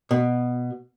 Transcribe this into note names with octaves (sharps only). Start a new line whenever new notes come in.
B2